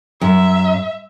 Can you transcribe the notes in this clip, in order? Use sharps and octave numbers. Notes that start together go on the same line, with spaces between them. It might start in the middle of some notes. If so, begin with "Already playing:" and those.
F#2 E5